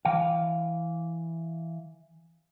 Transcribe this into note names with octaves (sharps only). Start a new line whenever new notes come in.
E3 F5